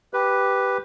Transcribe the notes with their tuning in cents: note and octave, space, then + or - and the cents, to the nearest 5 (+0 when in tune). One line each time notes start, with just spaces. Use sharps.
G4 +0 B4 +0